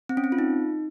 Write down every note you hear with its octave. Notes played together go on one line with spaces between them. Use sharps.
C4
C#4
C4
F4
D#4